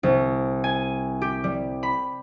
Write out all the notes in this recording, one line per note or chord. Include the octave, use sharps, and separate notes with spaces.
C2
G#5
G4
G3
B5